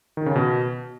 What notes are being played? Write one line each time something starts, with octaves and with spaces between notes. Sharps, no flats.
D#3
C#3
B2